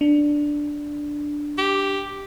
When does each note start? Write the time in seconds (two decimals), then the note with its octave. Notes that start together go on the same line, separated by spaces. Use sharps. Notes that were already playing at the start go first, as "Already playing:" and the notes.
0.01 D4
1.58 G4